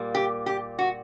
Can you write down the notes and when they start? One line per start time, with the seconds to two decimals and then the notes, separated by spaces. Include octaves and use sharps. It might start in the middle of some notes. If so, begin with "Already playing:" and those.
Already playing: A#2 G3 A#3
0.15 G4
0.46 G4
0.79 F#4